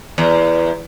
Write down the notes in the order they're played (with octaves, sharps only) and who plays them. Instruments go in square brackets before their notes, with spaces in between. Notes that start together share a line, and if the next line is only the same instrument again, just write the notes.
[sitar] E2